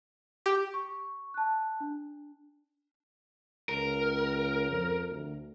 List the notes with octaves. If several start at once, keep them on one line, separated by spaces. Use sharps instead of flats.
G4
C#6
A5 F#6
D4
C#2 A#4
F2
D2